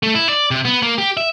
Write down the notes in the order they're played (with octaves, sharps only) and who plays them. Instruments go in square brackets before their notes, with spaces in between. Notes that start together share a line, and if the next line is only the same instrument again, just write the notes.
[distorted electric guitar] A3
E4
D5
C3
B3
A#3
G4
E5